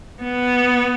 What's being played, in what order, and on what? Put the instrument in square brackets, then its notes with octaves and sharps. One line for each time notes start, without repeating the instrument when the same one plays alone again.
[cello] B3